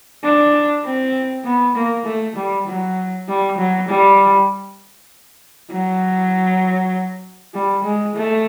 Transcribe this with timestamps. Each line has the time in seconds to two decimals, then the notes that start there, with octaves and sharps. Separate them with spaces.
0.23 D4
0.84 C4
1.44 B3
1.76 A#3
2.05 A3
2.36 G3
2.67 F#3
3.28 G3
3.58 F#3
3.88 G3
5.71 F#3
7.54 G3
7.84 G#3
8.15 A3